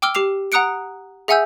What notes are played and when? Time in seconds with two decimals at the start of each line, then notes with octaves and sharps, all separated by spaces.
0.02 G5 D6 E6 F6 G7
0.15 G4 D6 C7 F7
0.52 F#5 A#5 D#6 F#6 C#7 D7
1.28 G#4 E5 F#5 G#5 E6 G6